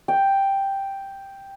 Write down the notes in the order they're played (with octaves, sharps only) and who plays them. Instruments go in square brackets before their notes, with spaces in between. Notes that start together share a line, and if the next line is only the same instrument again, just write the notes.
[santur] G5